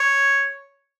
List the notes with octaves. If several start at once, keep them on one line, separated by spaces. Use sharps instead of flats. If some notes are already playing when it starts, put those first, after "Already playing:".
Already playing: C#5